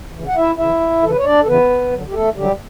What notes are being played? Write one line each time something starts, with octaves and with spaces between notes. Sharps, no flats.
C#3 E3
F#5
D2 E4 E5
C#3 E3 E4 E5
D2
C#3 E3 A4
B4
C#5
D2 D4 D5
A4
C#3 E3 B3 B4
E2
D3 F#3
G4
E2 A3 A4
D3 F#3 G3 G4